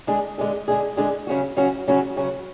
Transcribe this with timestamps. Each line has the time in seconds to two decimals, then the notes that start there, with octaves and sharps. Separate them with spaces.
0.07 D3 G#3 D4 G#4
0.38 D3 G#3 D4 G#4
0.68 D3 G#3 D4 G#4
0.97 D3 G#3 D4 G#4
1.27 C#3 F#3 C#4 F#4
1.56 C#3 F#3 C#4 F#4
1.87 C#3 F#3 C#4 F#4
2.16 C#3 F#3 C#4 F#4